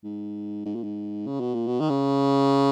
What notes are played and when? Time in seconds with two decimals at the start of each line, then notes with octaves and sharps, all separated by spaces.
0.04 G#2
0.65 G#2
0.75 A#2
0.84 G#2
1.27 C#3
1.41 B2
1.54 A#2
1.67 B2
1.80 D#3
1.89 C#3